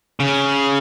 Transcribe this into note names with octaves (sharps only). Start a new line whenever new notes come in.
C#3